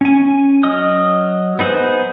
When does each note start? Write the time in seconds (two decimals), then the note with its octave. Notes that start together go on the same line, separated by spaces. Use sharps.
0.01 C#4 G#5
0.63 F#3 D#5 D#6 F6
1.59 B3 D#4 G#4 B4 C5